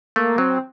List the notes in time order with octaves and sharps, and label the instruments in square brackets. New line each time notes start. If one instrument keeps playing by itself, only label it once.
[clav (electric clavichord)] A3 [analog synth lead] A#3
[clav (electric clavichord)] F#3 [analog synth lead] C4